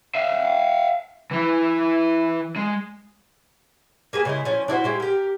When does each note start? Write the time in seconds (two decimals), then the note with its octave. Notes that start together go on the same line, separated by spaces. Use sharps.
0.15 E5 F5
1.31 E3 E4
2.56 G#3
4.13 A#3 G#4 B4 G#5
4.25 C#3 G#3 E4
4.45 F3 C#4 E4
4.68 D4 E4 F#4 C5
4.84 G#3 E4 G4
5.00 G4 A#4